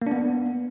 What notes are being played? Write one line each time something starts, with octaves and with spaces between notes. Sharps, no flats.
A#3
D4
B3